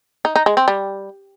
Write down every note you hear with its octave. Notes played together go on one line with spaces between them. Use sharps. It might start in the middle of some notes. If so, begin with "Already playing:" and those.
D#4
D#4
G#3
C4
G3